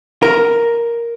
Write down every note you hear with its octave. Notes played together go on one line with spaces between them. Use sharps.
A#4